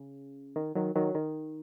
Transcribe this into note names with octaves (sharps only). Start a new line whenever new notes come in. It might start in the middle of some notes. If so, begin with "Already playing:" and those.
Already playing: C#3
D#3
D#3 F#3
D#3 F#3
D#3